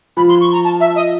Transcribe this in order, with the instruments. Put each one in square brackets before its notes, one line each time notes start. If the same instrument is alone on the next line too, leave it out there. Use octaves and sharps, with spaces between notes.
[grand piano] F3 [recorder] B5
[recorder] C6
C#6
A#5
A5
E5
D#5